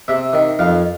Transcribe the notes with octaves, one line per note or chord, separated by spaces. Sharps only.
C3 E5
D#3
F2 F5